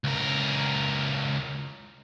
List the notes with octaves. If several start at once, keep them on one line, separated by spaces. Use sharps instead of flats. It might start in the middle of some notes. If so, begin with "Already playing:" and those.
C#2 A#4